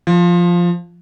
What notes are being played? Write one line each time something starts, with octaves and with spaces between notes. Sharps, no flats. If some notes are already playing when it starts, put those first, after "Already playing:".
F3